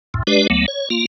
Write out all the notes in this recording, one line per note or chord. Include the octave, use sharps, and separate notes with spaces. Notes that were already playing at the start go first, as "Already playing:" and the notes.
C2 F2 A2
G#3 D4 G4 B4 D5
D2 F#3 A3 B3
C#5
A#3 F4